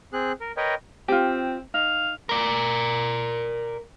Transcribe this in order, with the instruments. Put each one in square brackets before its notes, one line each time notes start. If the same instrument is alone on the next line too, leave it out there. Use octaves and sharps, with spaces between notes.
[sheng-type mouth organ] C4 G#4 F#6
A#4
A#4 B4 C#5 D#5 G5
[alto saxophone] C4 [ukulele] F4 G4
[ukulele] D#4 [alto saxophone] F5
[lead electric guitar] A#4 D5